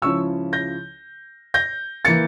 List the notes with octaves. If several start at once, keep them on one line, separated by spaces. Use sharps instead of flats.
C#2 C#3 F3 C#4 E4 C#6 E6
G6 A#6
G6 A#6
E3 A#3 A6 C#7